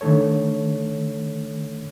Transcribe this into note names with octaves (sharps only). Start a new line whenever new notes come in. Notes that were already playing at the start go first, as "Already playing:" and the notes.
D3 D#3 A3 A4 C#5